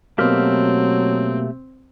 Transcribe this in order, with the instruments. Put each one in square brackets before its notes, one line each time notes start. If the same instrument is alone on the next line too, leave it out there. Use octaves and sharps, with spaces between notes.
[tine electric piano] B2 A#3 [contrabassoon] F#3 [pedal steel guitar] A3 G4 F6 [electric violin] C4